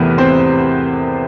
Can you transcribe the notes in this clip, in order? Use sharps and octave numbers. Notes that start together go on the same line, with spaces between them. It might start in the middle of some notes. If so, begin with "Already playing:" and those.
Already playing: E2 C3 E3 A3 B3 A#4 B4
C4 C5